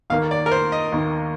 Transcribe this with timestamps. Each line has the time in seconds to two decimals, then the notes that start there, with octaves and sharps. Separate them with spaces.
0.10 D#2 D#3 A#3 F5
0.31 D5
0.46 A#4
0.51 C5
0.72 D#5
0.92 D#2 D#3 A#3